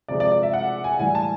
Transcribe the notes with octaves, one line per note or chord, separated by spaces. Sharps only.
C3 F3 G#3 D5
D5
D5
E5
F#5
G#5
A2 E3 G3 G#5
A5